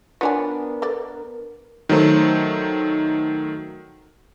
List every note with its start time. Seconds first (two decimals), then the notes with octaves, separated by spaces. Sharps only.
0.21 B3 D4 F4 A#4 C#5 G#5
0.82 A4 B4 D5
1.89 D#3 F#3 A3 C5